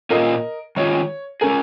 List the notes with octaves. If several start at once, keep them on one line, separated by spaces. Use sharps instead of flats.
A#2 A#3 C#4 F4 A#4 D#5
D#3 G#3 C#4 F4 C#5
G#3 C#4 G#4 A#4